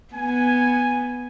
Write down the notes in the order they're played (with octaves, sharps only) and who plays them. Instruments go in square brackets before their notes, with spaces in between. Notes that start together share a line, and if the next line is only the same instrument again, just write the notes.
[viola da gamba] B3 [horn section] G#5